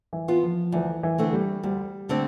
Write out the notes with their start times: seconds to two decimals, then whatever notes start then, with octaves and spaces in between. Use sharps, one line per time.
0.13 E3
0.28 B3 F4
0.43 F3
0.72 D2 E3
1.03 E3
1.18 D3 A3 C4
1.33 G3
1.63 D2 G3
2.09 D3 A3 C4